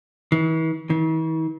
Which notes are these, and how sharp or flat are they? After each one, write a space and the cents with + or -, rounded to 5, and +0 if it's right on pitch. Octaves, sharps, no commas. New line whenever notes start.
E3 -40
E3 -45